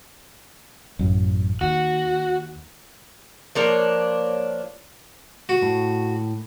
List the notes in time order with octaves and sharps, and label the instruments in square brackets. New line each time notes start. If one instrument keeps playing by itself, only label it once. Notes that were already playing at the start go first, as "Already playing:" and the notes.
[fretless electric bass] A1 F#2
[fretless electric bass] D#2 [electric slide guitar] F#4
[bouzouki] F3 A#3 D4 C#5
[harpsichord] F#4
[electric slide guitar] A2